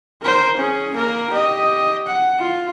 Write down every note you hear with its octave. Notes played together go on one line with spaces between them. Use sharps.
A#4 C5
C#4 G#4
A#3 A#4
G4 D#5
F#5
F4